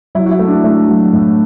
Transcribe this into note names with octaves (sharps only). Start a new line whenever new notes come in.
F#3 E4
F#4
E4
A3
D4
A3
F#3
A2